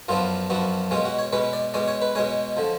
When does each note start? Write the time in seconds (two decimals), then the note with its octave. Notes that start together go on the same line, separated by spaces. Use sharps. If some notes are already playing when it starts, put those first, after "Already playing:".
0.09 F#2 F3 B3 D4 F4
0.50 F#2 F3 B3 D4 F#4
0.91 B2 G#3 C#4 F4
1.05 F#4
1.19 C#5
1.33 B2 G#3 C#4 B4
1.53 D5
1.74 B2 G#3 C#4 D5
1.88 C#5
2.02 B4
2.15 B2 G#3 C#4 C#5
2.57 D3 F3